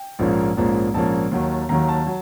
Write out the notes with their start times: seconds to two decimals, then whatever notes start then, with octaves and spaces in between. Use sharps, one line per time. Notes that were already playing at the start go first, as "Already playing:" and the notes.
Already playing: G5
0.19 A#1 G#2 F3 A#3 C#4
0.57 A#1 G#2 F3 A#3 C#4
0.94 A#1 G#2 F3 A#3 C#4 A5
1.31 D#2 D#3 F#3
1.69 D#2 D#3 F#3 A#5
1.89 A5
2.07 F#3